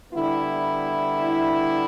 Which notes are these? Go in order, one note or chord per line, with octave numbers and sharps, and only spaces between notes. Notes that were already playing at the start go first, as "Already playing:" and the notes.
D3 G3 B3 E4